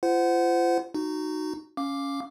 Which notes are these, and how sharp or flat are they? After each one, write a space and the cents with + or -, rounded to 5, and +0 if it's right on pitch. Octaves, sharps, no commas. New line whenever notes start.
F4 -35 C5 -25 F#5 +0
D#4 -15 F#4 +0
C#4 +5 F5 +0 D6 +0